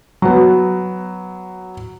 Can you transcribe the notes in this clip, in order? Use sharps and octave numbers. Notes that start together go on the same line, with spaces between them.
F#3 B3